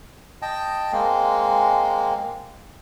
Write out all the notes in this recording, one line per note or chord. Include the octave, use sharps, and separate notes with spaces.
D#5 G5 A5
G#3 A#3 C4